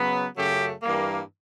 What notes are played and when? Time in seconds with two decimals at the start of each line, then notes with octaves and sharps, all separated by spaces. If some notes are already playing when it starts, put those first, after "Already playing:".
Already playing: C#3 F#3 B3
0.37 F#2 C#3 F#3 A3 G4
0.83 G2 E3 G3 A#3